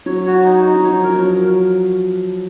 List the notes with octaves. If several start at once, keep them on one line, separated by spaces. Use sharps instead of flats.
F#3 C#5
F#4
D#4
D#4
F#3
F3 C#5
A#4
F3
F#3